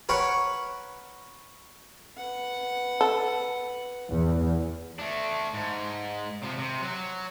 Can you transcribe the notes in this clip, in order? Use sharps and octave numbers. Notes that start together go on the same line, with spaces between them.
A#4 B4 C#5 F#5
B4 F#5
A4
E2
A3 D4
G#2
C3 F3
C3
F#3